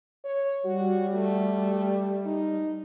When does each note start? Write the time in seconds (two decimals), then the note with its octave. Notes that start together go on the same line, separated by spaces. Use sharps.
0.24 C#5
0.64 G3 F#4
1.15 A3
2.26 D#4